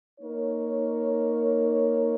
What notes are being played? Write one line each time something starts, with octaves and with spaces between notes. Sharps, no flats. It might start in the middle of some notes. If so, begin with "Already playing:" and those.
A#3 D#4 A#4 C#5